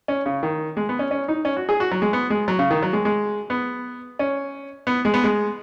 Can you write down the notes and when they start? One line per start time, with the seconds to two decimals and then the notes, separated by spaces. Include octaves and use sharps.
0.08 C#4
0.26 C#3
0.43 D#3
0.77 G#3
0.89 B3
0.99 C#4
1.11 C#4
1.28 D#4
1.45 C#4
1.57 F#4
1.69 G#4
1.80 F#4
1.92 F#3
2.02 G#3
2.13 B3
2.30 G#3
2.48 F#3
2.59 C#3
2.71 D#3
2.83 F#3
2.93 G#3
3.05 G#3
3.50 B3
4.19 C#4
4.87 B3
5.05 G#3
5.14 B3
5.24 G#3